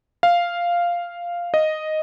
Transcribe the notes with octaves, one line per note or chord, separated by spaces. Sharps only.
F5
D#5